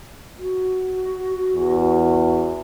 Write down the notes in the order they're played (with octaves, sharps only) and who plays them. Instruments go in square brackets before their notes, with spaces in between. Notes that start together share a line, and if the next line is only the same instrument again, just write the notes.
[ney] F#4
[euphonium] E2